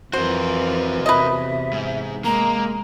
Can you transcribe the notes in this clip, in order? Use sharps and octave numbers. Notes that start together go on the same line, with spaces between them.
F2 E3 F4 F#4 A#4 C5
E2 C3 B4 D#5 E5
G#2
G#3 A#3 A#5